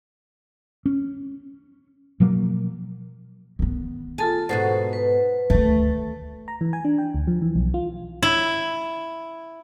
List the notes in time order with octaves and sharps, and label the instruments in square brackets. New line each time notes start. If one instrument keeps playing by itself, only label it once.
[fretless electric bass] C#4
B2 F3 F#3 A#3
[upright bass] D#3 B3
[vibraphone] F4 A4 A5 [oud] G#4
[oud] G#2 B2 F#4 [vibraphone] A4 C5 F#5
[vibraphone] B4
[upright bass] D2 D#3 [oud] A3
[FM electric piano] A#5
E3
G#5
D4
G5
D2
F3
E3
B1
F4
[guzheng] E4